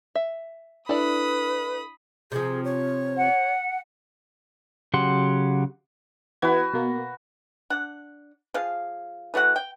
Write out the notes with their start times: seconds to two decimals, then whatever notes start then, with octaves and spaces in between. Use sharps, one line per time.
0.15 E5
0.89 D4 E4 A4 B4 D5 B5 D#6
2.32 C3 F3 G#4
2.64 C#5
3.18 F#5
4.94 C#3 F#3 G4 F#5 C6
6.42 E3 B3 F#4 B4 G#6
6.74 B2 A#3
7.70 D4 F#5
8.54 F3 G#4 F5
9.34 E3 A3 F#4 F#5
9.56 G5